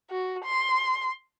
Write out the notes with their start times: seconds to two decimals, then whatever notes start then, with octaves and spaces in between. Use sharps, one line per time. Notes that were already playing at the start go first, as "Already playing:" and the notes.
0.10 F#4
0.44 C6